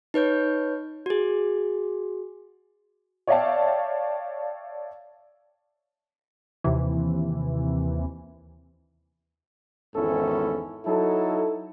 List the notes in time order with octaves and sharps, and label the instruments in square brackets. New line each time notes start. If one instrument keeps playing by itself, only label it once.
[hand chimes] D#4 B4 C#5 G6
F#4 G#4
[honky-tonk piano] C#5 D5 E5 F5 G5 A5
[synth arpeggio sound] D#2 C3 E3
[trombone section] G#1 E2 G#2 C#4 E4 A4
F#3 D#4 E4 A4